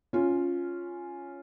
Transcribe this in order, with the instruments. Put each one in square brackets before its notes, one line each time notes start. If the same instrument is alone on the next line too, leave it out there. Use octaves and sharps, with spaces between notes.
[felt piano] C#4 F4